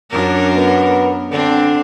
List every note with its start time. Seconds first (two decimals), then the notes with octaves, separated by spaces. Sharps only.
0.11 F#2 D4 A#4
0.56 B3
1.32 D3 C4 D4